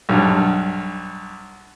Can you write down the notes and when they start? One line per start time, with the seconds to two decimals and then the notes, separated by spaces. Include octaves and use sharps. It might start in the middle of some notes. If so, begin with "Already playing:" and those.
0.09 B1 G2